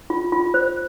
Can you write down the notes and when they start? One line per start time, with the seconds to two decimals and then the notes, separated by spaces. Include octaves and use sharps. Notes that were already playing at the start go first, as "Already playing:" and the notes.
0.10 F4
0.32 F4
0.54 C5